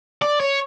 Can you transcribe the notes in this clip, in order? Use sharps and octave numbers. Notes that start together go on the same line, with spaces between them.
D5
C#5